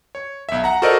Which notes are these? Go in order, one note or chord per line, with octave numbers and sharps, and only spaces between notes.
C#5
B1 E5
F#5 A#5
F#4 A4 A#4 C5 D5 D#5